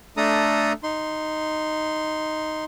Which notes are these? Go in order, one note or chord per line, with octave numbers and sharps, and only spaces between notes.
A3 D4 A4 A#5 D#6
D#4 C6